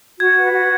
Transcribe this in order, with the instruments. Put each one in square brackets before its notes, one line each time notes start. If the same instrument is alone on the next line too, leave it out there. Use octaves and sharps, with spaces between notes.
[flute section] F#4 [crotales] G#6
[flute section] B4
F#4